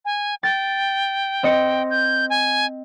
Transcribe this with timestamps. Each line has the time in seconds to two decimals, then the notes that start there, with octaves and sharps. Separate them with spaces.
0.05 G#5
0.43 G5 A6
1.43 C4 D#5 C#7
1.90 G6
2.30 G#5